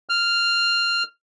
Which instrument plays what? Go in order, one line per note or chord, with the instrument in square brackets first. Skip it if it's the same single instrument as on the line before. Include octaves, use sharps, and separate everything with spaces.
[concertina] F6